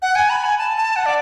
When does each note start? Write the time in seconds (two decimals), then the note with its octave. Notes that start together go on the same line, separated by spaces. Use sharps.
0.02 F#5
0.16 G#5
0.30 B5
0.44 G#5
0.58 A5
0.77 A5
0.96 F#5
1.06 D5